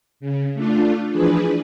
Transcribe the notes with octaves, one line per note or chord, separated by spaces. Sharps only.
C#3
A3 D4 F4
E3 F3 D4 G#4 B4